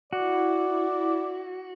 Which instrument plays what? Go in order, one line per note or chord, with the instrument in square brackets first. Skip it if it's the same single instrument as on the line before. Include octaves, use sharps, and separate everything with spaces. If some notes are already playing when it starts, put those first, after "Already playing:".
[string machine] E4 [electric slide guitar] F#4 [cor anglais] D5